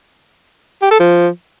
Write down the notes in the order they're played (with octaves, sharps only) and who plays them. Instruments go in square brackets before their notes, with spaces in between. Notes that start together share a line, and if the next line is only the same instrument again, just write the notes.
[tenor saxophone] G4
A4
F3